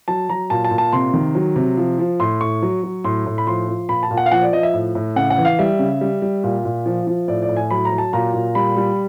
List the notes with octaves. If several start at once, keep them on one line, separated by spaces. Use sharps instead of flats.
F#3 A5
F#3 A#5
A#2 A5
A5
A#2
A5
C3 C6
D#3
F#3
C3
F3
F3
A2 C6
A2 C#6
F#3
F#3
A2 C6
A2
B5
F3 C6
F3
A#2 B5
A5
A#2
F#5
F5
F3 F#5
D5
F3 D#5
E5
A2
A2
C#3 F#5
F#5
E3
F5
G3 E5
C#3
G3
G3
A#2
A#2
F3
F3
A2 D5
D5
A2
G#5
F#3 B5
A#5
F#3
A5
A#2 A#5
A#2
G3 B5
G3